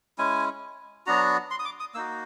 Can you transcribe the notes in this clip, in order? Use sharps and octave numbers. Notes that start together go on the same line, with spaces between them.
G#3 C#4 E4 G#5
F#3 B3 D4 F#4 A#5
C6
D#6
D6
D#6
A#3 D#4 F#4 E6